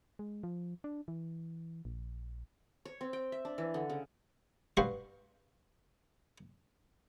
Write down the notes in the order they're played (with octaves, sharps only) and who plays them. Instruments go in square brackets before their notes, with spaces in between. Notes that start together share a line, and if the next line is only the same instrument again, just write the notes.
[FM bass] G#3
F3
D4
E3
A#1
[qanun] C#5
C4
G5
E5
D4
E3
D3
C#3
[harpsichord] G2 F#4 B4 C5 F5 F#5